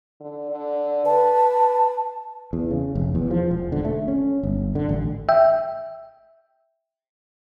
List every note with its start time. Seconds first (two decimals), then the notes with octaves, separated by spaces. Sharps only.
0.20 D3
0.51 D3
1.06 B4 A5
2.53 E2
2.71 C#3
2.95 F1
3.15 E2
3.31 F3
3.51 E1
3.72 D3
3.85 A3
4.08 C#4
4.43 G1
4.75 D3
4.89 A1
5.29 E5 G5